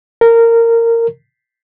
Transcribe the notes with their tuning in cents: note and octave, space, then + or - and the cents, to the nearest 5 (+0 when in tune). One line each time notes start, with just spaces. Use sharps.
A#4 -15